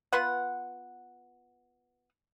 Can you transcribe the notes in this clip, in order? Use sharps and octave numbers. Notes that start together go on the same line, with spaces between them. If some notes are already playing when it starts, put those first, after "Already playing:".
B3 F4 B4 F#5